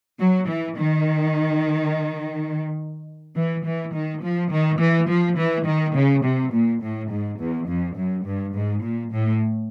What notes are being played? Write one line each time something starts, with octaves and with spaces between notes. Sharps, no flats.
F#3
E3
D#3
E3
E3
D#3
F3
D#3
E3
F3
E3
D#3
C#3
C3
A#2
A2
G#2
E2
F2
F#2
G2
G#2
A#2
A2